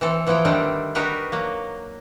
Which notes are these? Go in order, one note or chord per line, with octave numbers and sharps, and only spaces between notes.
E3 C4 A4
E3 F3 B3 E4 G5
D3 D#3 G3 A3 C4 D4
D4 D#4 F#4 G4 A#4 B4
F#3 A#3